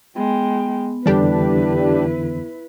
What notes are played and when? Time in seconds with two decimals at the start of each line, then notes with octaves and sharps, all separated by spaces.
0.16 G#3 B3 G5
1.06 F2 D3 E3 G3 D4 E4 G4 B4